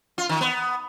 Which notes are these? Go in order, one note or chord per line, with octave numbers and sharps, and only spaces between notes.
F4
D#3
B3